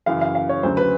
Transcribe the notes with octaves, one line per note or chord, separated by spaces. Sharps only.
F#2 C#3 E3 F5
F5
F5
C#5
D2 C#3 F#3 C5
B4